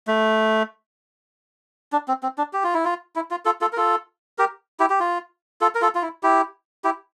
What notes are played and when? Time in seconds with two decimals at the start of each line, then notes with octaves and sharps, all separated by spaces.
0.07 A3
1.92 D4
2.08 C4
2.23 C4
2.38 D4
2.53 G4
2.64 F4
2.74 E4
2.85 F4
3.16 E4
3.31 F4
3.45 F4 A4
3.61 F4 A4
3.73 A#4
3.77 F4 A4
4.38 G4 A#4
4.79 E4 G4
4.90 G4
5.00 F4
5.61 F4 A4
5.75 A#4
5.82 F4 A4
5.95 F4
6.02 E4
6.23 E4 G4
6.84 E4 G4